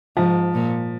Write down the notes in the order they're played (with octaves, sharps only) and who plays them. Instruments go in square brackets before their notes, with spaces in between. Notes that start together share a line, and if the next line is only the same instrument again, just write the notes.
[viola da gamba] G#2 [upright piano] F3
[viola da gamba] A#2